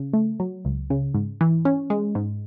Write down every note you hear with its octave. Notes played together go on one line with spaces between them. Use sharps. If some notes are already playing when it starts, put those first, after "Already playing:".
Already playing: C#3
A3
F#3
C#2
C#3
G#2
E3
C#4
G#3
G#2